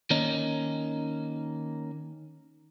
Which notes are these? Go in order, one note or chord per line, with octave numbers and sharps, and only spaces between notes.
D#3 A#3 C#4 D#4